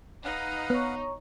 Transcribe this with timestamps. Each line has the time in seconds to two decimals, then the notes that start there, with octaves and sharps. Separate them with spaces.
0.25 D#4 B4 F5 F#5
0.70 B3 C#5 A#5 C#6